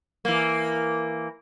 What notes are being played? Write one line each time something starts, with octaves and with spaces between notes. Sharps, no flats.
E3 A#3